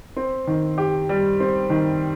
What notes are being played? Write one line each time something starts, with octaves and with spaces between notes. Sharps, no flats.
C4
D#3
G4
G3
C4
D#3